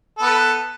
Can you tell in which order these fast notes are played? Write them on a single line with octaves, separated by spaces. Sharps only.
A4 B3 B4